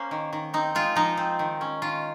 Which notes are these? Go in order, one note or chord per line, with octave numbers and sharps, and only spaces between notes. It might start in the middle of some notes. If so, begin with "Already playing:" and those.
Already playing: A#3 C#4 C5
D#3
D#3
C4 D#4
G#3 F4
F3 D#4
C4
D#3
C#4
D#3 F4